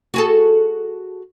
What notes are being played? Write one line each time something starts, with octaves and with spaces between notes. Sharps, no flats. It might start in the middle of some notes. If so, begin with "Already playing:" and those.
F#4 G#4 A4